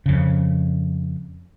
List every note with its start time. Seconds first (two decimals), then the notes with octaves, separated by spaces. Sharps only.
0.06 F2 C#3